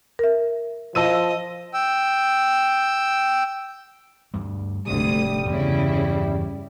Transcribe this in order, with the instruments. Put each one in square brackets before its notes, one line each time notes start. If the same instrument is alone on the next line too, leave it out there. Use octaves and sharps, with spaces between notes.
[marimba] A#4 E5
[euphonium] F3 [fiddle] D#5 [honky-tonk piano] A5 E6 D#7
[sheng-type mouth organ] G5 E6
[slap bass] D2 G2 G3
[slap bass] F1 G#2 [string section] D2 D#6 [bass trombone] G3
[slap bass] E2 G2 F#3 [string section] C#3 E4